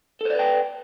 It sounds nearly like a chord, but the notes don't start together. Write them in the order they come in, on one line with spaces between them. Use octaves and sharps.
A4 C5 D5 B4 G5